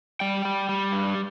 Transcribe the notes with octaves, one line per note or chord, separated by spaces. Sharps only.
G3 G5
G3
G3
G2